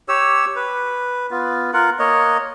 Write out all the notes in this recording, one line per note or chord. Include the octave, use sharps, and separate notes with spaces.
G4 C#5 E6
B4
B3 F4
F4 A#4 F#5
A#3 C#5 D#5